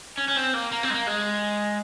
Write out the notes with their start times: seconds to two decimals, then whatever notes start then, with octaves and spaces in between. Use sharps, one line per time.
0.18 C#4
0.28 C#4
0.36 C4
0.54 A#3
0.72 A#3
0.83 C4
0.90 G#3
0.94 A#3
1.07 G#3